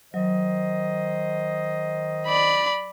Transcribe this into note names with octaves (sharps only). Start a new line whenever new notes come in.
D#3 F#3 C5 D#5
D5 B5